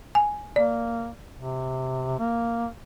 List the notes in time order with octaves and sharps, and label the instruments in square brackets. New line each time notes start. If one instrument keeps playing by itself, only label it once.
[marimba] G#5
[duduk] A#3 [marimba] D5
[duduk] C3
A#3